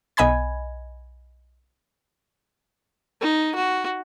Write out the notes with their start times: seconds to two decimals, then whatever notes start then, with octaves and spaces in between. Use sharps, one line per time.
0.17 B1 D#5 G#5 B5 G#6
3.21 D#4
3.55 F#4